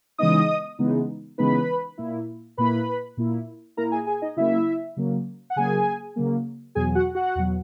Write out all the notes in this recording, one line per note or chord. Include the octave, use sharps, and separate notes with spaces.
C#3 E3 G#3 B3 D#4 D#5 D#6
C#3 E3 G#3 B3 D#4
C#3 E3 G#3 B3 D#4 B4 B5
A#2 A#3 E4
A#2 A#3 E4 B4 B5
A#2 A#3 E4
A#2 A#3 E4 A#4 A#5
G#4 G#5
G#4 G#5
D#4 D#5
C#3 F#3 A#3 E4 E5
C#3 F#3 A#3
F#5
C#3 F#3 A#3 G#4 G#5
C#3 F#3 A#3
E2 B2 F#3 G#4 G#5
F#4 F#5
F#4 F#5
E2 B2 F#3